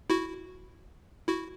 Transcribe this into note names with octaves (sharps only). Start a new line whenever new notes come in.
E4 F#4
E4 F#4